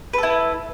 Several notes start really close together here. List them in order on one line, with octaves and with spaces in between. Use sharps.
B4 A4 E4